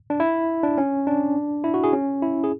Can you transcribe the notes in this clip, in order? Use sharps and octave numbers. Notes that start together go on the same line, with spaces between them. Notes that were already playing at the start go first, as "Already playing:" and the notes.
D4
E4
D4
C#4
D4
E4
F#4
G#4
C#4
E4
G#4